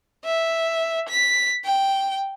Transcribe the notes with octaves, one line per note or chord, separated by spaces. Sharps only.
E5
B6
G5